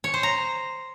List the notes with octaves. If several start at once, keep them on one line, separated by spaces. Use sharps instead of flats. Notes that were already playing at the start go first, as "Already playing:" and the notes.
C#5
C5
A#5